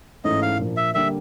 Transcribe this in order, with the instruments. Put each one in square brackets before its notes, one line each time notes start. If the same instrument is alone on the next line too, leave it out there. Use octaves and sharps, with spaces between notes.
[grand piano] G#2 E3 A3 C#4 E4 [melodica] D#5
[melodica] F5
[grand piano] A#2 F3 A#3 D4
[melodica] E5
[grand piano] D3 G3 A#3 [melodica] E5